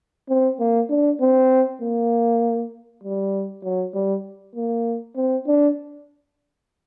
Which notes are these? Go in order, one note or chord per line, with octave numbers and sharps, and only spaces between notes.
C4
A#3
D4
C4
A#3
G3
F#3
G3
A#3
C4
D4